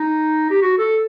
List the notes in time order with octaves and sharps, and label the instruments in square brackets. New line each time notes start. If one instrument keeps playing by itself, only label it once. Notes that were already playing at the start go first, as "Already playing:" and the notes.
Already playing: [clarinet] D#4
G4
F#4
A4